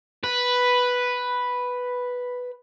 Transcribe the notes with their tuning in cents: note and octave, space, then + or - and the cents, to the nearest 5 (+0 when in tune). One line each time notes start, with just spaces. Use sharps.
B4 +0